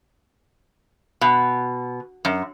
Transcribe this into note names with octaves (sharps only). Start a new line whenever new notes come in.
B2
F#2